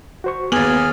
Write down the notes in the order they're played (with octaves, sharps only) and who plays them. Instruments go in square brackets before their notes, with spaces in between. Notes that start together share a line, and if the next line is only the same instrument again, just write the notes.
[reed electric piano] F#4 C5 C#6
[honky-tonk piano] D#2 F#7 [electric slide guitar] B3 [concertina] G#4 F6 [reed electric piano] D6 G#6 A6